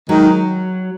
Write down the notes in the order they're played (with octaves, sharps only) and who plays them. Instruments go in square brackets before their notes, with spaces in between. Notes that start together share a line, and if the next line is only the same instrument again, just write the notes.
[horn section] D#3 G#3 D#4 [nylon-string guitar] F#3